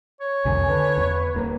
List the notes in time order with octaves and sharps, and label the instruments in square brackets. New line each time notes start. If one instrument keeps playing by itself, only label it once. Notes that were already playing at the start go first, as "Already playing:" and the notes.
[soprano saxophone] C#5
[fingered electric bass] C2 F2 D#3 [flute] G#5
[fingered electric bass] D3 [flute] B4
[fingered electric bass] E2
D1 A#3